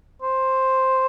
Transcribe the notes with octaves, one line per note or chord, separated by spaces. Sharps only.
C5